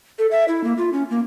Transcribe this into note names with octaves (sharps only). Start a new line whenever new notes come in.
A4
E5
E4
A#3
F4
C#4
A#3